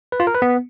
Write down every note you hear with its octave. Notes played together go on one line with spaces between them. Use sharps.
B4
F4
A#4
B4
B3